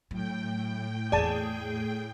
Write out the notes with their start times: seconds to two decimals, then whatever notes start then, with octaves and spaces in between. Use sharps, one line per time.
0.11 A2 F#3 G5
1.12 E2 A#3 G#4 D5 A5